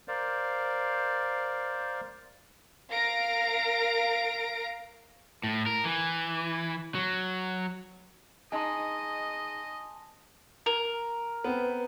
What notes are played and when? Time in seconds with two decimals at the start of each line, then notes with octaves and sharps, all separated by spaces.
0.08 A#4 C5 D5 F5
2.90 A#4 F5 A#6 D7
5.44 A2
5.66 A#4
5.85 E3
6.95 F#3
8.52 G#3 D#4 D#5 G#5 A5 C6
10.66 A#4
11.44 B3 C4 B4